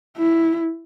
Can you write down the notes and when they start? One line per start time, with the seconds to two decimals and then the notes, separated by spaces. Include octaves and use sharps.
0.18 E4